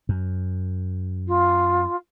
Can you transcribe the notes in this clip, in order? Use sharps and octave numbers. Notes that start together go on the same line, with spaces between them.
F#2
F4